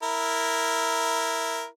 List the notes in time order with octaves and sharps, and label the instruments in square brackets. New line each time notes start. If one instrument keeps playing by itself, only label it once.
[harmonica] E4 A#4